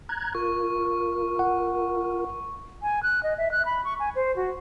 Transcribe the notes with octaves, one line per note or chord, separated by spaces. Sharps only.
A#5 F#6 G#6
F4 A#4 C#6
F#5
G#5
F#6
D#5
E5
F#6
B5
C#6
G#5
C5
F#4